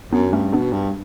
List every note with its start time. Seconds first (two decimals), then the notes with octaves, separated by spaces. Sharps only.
0.13 F#2 B3 D4
0.33 G2 A3 C#4
0.53 B2 B3 D4
0.73 G2